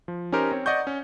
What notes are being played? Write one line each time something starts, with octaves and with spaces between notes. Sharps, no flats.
F3
C#4 D#4 G4 A#4 C5
C4 C#5
D5 D#5 F#5 C#6 G6
C#4